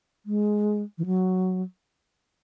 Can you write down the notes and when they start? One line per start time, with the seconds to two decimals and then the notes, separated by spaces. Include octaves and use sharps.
0.26 G#3
0.98 E3
1.06 F#3